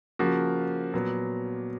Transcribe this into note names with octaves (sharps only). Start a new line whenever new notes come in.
C#3 F3 A#3 F#4
A#2 F#3 B3